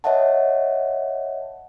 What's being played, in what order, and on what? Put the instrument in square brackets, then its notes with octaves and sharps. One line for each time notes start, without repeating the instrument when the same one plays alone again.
[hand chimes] C#5 D#5 E5 F#5 A5